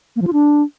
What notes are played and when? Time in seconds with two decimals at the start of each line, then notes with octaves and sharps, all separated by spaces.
0.16 A#3
0.22 F3
0.27 F4
0.33 D4